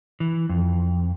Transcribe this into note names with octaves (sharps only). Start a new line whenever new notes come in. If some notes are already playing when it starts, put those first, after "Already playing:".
E3
F2